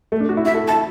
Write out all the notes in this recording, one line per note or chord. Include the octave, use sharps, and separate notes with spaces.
A3
D4
F#4
E4
F#4 E5
A4
E4 A5